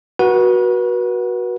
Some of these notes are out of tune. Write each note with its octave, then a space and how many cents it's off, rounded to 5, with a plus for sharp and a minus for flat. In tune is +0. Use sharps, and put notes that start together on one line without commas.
F#4 +0 B4 -35 F#5 +0